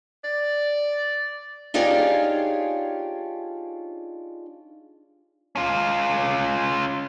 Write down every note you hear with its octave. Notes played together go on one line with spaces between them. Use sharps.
D5
D4 D#4 F4 G4 G#4 C#5
C#4 F4